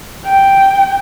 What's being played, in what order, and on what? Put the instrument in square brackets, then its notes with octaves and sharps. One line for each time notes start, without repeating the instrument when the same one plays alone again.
[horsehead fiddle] G5